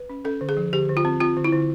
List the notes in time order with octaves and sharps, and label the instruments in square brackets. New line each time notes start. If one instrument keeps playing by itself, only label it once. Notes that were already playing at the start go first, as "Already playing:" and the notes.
Already playing: [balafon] B4
C#4
C#4 A4
D3
G#4
F3
D3 G4
D3
F4
C4
C4 F4
D3
E4
D3